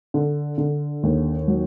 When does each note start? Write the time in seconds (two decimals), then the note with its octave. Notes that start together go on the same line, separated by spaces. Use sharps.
0.14 D3
0.58 D3
1.03 D#2
1.48 F#3